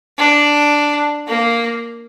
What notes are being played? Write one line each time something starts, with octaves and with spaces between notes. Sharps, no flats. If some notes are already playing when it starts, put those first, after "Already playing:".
D4
A#3